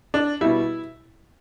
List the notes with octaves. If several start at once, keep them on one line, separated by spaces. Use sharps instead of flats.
D4
B2 G3 E4